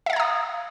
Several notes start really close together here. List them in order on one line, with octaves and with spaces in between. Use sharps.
E5 F5 G#6 A#5 D#6